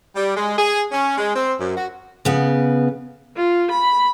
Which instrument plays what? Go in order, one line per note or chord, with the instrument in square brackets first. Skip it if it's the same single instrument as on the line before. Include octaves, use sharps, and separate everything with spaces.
[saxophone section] G3
G#3
G#4
C#4
G#3
C4
F#2
F#4
[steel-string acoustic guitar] C#3 B3
[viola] F4
B5